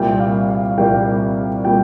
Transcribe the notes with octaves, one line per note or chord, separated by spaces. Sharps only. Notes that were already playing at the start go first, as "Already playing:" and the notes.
Already playing: C2 A#2 G3 A#3 G5
F5
F5
C2 A#2 G3 A#3 G5
A#2 G3 A#3 G5